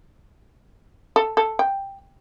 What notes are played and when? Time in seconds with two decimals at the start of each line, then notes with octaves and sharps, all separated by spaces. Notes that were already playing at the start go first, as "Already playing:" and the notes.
1.16 A4
1.37 A4
1.59 G5